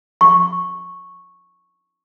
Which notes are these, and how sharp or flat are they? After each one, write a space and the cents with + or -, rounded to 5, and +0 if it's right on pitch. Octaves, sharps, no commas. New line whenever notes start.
C#6 -10